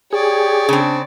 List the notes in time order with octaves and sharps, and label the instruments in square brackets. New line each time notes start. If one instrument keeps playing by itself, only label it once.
[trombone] G4 [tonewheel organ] G#4 [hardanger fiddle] C#5 D5
[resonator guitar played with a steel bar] C#3 C4 [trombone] D4